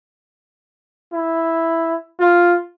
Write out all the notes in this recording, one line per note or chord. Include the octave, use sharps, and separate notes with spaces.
E4
F4